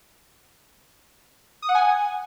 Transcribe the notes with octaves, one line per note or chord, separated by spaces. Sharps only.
D#6
F#5
G#5